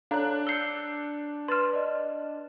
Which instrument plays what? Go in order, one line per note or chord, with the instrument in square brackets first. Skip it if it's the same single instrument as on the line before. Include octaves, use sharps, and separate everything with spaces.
[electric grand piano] D4 F#6 [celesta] A4 C#5 [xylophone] F5 A#5
[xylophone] E6 C7 [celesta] G6 C#7 G7
[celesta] B4 A6 E7 [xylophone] C6 F6
[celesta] D5 D#5